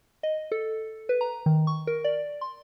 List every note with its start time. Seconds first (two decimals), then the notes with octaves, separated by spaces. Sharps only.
0.23 D#5
0.52 A4
1.09 B4
1.21 A#5
1.46 D#3
1.67 C#6
1.87 A#4
2.04 D5
2.41 C6